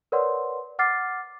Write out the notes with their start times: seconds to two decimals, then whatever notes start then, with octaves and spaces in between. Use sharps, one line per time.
0.12 A#4 B4 C#5 D5 F#5 C6
0.79 F#5 D6 F6 A6 C7